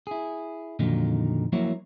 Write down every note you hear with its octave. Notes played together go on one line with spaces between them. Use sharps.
E4 G#4
F2 A#2 D3 D#3 F#3 D#4
F3 F#3 A#3 E4 C#5